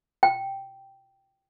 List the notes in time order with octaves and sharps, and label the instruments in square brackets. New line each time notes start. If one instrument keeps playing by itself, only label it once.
[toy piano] G5